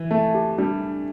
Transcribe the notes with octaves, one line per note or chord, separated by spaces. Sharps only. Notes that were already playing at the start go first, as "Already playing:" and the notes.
Already playing: E3
A3 A5
G4
G3 D4
D4